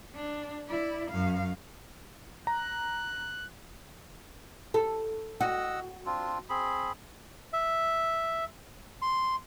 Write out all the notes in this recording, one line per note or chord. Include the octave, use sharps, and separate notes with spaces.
D4
E4 D5
F#2 F5
A#5 F#6
A4
F#4 D#5 F#5 E6
C4 D4 F4
C4 G#4 B5
E5
C6